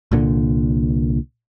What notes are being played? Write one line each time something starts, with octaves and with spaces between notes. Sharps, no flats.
C2 A#2 D3